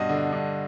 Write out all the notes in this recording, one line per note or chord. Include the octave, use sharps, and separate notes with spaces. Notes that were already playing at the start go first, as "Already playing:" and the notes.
Already playing: G2 B2 D#5
D3
G2